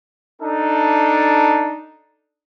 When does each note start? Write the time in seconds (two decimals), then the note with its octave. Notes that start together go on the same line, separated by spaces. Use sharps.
0.41 D4 D#4 A4